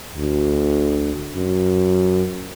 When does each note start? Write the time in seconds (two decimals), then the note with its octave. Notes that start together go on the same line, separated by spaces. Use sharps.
0.16 D2
1.35 F#2